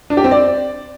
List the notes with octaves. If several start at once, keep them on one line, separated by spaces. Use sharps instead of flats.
D4
G4
C4
D5